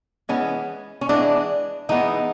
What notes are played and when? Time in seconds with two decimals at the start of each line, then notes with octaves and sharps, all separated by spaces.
0.29 E3 G#3 B3 C#4
1.01 C#4
1.09 E3 G#3 B3 D4
1.89 E3 G#3 B3 D#4